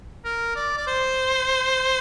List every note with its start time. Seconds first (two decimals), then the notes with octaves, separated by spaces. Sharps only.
0.25 A#4
0.56 D5
0.78 D5
0.87 C5